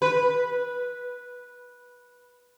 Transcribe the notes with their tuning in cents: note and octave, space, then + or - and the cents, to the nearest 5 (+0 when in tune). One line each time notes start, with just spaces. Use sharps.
B4 -10